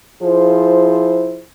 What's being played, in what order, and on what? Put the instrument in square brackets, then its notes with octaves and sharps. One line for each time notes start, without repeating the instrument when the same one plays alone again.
[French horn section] F3 E4 F4 G#4 C5